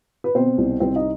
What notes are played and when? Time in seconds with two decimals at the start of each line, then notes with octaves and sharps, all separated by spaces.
0.24 B4
0.35 B2 C4 C5
0.58 C2
0.80 C2 C4 C5
0.96 D#4 D#5